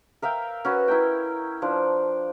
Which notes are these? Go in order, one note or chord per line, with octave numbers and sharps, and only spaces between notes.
A#4 E5 F5 G5
C#4 F#4 B4
E4 A#4 G5
F3 D4 D5